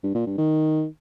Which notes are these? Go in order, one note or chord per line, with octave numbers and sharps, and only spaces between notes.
G2
A#2
G2
D#3